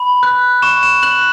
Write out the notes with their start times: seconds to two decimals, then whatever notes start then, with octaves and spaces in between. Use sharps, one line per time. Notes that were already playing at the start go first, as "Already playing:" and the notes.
Already playing: B5
0.23 F#6
0.62 C#6 E7
0.83 E7
1.03 F#6 F#7